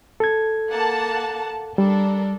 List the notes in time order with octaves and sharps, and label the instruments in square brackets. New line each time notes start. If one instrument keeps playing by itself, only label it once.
[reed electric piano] A4 G#6
[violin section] A#3 F#5 A5
[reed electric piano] G3 [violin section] D4 A4 A#4